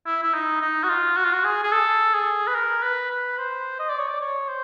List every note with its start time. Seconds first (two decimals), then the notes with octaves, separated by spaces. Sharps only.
0.06 E4
0.23 E4
0.34 D#4
0.62 D#4
0.84 F#4
0.89 F4
1.17 F#4
1.25 F4
1.33 F#4
1.44 G#4
1.64 G#4
1.72 A4
2.14 G#4
2.47 B4
2.55 A#4
2.83 B4
3.10 B4
3.38 C5
3.80 D#5
3.89 D5
3.99 C#5
4.08 D5
4.21 C#5
4.49 C5